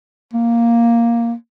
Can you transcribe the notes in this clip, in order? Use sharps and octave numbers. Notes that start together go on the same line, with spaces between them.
A#3